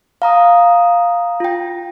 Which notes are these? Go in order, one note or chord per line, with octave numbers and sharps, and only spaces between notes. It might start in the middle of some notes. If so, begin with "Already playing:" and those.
F5 A#5 D#6
F4 G5